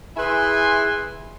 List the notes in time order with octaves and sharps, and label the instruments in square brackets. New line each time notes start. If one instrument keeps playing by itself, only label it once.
[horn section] E4 G#4 B4 E5 G#5 C6